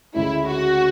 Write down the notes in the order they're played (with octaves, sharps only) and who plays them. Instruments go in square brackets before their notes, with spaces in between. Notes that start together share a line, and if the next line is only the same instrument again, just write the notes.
[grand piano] D2 C#3 G#3 C#4 [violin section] E4
[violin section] F#4